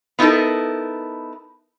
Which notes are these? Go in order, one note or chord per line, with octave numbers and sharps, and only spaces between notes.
B3 D#4 E4 G4 A4 A#4